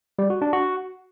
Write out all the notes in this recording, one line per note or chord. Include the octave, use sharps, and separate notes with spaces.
G3
F#4
D4
F#4